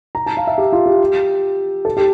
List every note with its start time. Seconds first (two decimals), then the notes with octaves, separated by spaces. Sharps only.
0.15 A#5
0.26 A5
0.37 F5
0.47 E5
0.58 G4
0.72 F4
0.86 G4
1.85 A4
1.97 G4